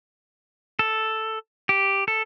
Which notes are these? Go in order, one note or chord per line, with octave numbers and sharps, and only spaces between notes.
A4
G4
A4